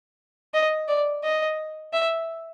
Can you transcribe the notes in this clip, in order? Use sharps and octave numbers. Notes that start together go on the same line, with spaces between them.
D#5
D5
D#5
E5